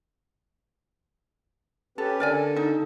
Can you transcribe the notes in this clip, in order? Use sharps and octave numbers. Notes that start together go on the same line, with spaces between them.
C#4 G4 A4 B4
D3 A4 A#4 D5 G#5
D#4